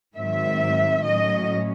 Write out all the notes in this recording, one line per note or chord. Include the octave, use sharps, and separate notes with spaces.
G#2 D#3 F#3 C4 E5
A2 F#3 C#4 D#5